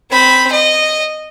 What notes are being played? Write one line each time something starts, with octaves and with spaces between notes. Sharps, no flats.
C4 B5
D#5